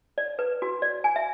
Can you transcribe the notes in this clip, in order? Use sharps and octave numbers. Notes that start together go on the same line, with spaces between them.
D5
B4
F#4
D5
G#5
E5